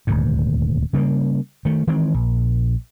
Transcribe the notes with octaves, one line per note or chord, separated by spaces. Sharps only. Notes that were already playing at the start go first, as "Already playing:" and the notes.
D#1 D2 G#2
C#3 G3 A3 A#3
D#3 A3
D#3 E3 G#3 C4
A#1